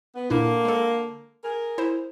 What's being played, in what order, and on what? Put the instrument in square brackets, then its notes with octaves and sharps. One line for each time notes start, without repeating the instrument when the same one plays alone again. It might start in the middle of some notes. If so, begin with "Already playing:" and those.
[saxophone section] B3
[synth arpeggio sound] A#2 D4 E4 [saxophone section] D3 A#3
[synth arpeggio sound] G#3 A4
[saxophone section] G#4 A#4
[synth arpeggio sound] E4 C5